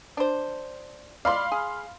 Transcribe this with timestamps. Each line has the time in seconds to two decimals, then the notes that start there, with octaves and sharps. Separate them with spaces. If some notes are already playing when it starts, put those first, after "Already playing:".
0.17 D4 C5
1.25 D5 F5 B5 C6
1.52 G#4